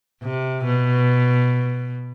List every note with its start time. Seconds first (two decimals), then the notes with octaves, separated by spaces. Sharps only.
0.23 C3
0.64 B2